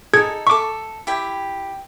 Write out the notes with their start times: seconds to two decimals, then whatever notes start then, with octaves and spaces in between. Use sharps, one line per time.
0.13 D#4 G#4 A4 G#6
0.47 A4 E5 C#6 D6
1.07 E4 G4 G5